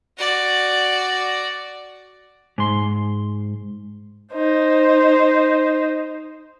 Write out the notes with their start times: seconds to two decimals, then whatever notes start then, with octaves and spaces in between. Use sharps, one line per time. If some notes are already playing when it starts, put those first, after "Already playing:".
0.18 F#4 D5
2.58 G#2 C6
4.33 D#4 C5